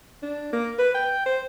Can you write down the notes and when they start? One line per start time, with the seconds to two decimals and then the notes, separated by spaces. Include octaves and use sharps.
0.23 D4
0.53 A#3
0.79 B4
0.95 G5
1.26 C5